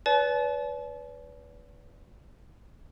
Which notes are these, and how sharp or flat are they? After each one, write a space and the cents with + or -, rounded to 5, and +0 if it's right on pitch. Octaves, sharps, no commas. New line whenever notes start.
B4 +0 D5 -45 A5 -45